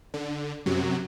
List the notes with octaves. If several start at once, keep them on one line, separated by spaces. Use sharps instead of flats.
D3
F#2 C3 F#3